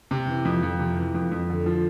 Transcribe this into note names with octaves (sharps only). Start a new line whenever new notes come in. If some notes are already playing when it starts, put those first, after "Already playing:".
C3
E3
F2
F2
C3
E3
F2
F2
D3
F3